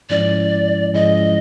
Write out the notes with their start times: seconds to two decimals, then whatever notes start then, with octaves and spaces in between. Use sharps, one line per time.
0.10 G#2 F3 G#3 C#4 E4 D5
0.94 G#2 F3 G#3 C#4 E4 D#5